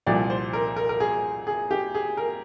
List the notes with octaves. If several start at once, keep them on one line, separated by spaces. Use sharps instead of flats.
C2 A#2 F3 D5
C5
A#4
A#4
A#4
G#4
G#4
G4
G#4
A#4